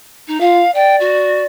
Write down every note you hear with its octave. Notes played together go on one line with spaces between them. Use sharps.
D#4
F4 F5
D5 G5
F#4